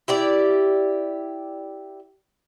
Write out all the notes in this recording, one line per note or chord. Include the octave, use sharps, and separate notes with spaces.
E4 G4 D5